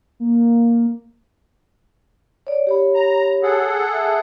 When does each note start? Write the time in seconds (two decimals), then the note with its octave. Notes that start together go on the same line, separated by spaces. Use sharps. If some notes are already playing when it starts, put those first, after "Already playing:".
0.20 A#3
2.47 C#5 D5
2.67 G4 C#5 B5
2.95 A#5
3.43 G#4 A4 F#5
3.93 E5 A5